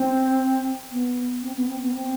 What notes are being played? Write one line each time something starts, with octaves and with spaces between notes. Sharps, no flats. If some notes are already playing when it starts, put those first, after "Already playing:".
Already playing: C4
B3
C4
B3
C4
B3
C4